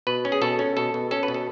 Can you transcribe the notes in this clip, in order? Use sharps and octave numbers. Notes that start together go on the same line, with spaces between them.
B2 B4
C#4
G#4
B2 A4
C#4
B2 A4
B2
C#4 A4
B4
B2
A4